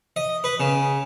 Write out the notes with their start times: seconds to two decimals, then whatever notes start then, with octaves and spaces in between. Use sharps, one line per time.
0.16 D#5
0.44 B4
0.60 C#3